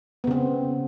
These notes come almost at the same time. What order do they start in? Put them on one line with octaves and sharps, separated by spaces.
B3 C#3 C4